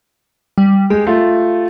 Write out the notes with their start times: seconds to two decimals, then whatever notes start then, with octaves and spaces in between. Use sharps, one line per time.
0.58 G3
0.90 G#3 G4
1.07 A3 F4